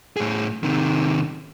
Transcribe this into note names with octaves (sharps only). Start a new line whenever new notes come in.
A2 G#4
C3 D#3